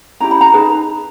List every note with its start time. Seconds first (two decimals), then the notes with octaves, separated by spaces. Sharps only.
0.20 C#4 E4 G4 A#5
0.31 B5
0.41 A#5
0.53 D#4 G#4 B4 A5